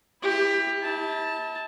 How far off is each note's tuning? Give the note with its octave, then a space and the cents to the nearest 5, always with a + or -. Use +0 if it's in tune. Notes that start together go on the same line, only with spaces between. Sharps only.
E4 +5 G4 +25
E4 -40 A5 +0